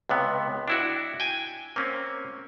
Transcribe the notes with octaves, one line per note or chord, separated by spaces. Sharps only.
C#2 C3 B3
D4 E4 F#4
G5 G#5
A#3 C4 C#4